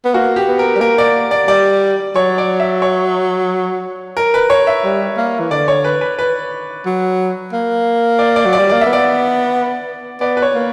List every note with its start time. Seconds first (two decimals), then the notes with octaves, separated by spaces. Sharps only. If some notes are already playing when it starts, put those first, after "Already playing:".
0.05 B3
0.14 A#3 F#4
0.36 G4
0.48 B3
0.59 A#4
0.76 G3
0.81 A#3 A#4
0.98 D5
1.31 D5
1.48 G3 D5
2.15 F#3 C#5
2.38 D5
2.60 E5
2.82 C#5
4.17 A#4
4.34 B4
4.50 C#5
4.67 E5
4.84 G3
5.17 A#3
5.40 E3
5.51 D3 D5
5.68 C#5
5.84 B4
6.01 B4
6.19 B4
6.86 F#3
7.52 A#3
8.19 D5
8.36 D5
8.45 F#3
8.53 D5
8.58 G3
8.69 A#3 D5
8.81 B3 E5
8.93 D5
10.20 B3 D5
10.37 B4
10.42 C#5
10.54 A#3